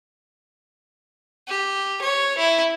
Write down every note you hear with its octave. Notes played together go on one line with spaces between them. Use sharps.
G4
C#5
E4